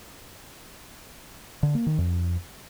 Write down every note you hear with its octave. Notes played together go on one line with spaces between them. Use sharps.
D3
A#3
D#3
F2